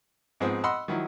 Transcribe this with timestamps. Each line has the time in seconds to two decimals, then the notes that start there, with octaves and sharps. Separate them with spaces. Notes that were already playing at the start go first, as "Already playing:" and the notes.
0.40 G#2 F3 B3 C4 G#4
0.64 D#5 F#5 B5 C6 E6
0.88 D#3 F3 F#3 E4